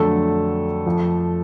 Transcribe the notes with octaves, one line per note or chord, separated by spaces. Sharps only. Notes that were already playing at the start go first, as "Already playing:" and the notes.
Already playing: F2 D3 F#3 A3 A4
F2 F3